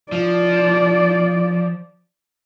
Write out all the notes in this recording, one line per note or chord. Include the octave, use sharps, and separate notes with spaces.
F3 D5